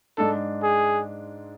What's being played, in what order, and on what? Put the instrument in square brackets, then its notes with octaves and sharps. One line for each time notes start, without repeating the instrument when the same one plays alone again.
[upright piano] G#2 G#3 D4 [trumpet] A4
[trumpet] G#4